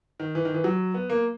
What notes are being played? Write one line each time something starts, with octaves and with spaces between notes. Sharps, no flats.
D#3
E3
D#3
E3
F#3
B3
A#3